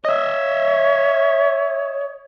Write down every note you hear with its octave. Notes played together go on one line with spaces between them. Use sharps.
C#5 D#5 E5